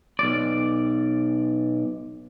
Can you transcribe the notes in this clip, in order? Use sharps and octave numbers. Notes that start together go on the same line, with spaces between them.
B1 D5